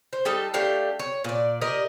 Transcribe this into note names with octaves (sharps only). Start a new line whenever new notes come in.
C5
G3 D#4 A4
A3 D4 G4 F5
C#5
A#2 D5
G4 A#4 D5 D#5